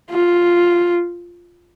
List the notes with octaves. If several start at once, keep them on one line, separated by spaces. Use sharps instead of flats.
F4